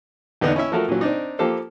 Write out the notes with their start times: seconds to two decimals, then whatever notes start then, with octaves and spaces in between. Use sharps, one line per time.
0.41 E2 D3 B3 D4 D#4
0.56 C#4 E4 E5
0.72 F3 A3 F#4 A4 A#4
0.89 A#2 E3 F#3
1.01 C4 D4 D#4
1.39 F3 A#3 G4 A4 C5